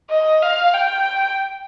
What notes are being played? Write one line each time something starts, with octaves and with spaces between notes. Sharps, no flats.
D#5
F5
G5